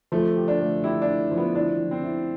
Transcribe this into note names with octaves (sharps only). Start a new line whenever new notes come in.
F3 A3
G4
D4
A3
E4 G4
D4
E4
F3
B3
D4 E4
F3
C4
E4